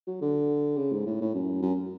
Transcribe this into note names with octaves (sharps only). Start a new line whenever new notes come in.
F#3
D3
C#3
G#2
A2
A2
F#2
F#2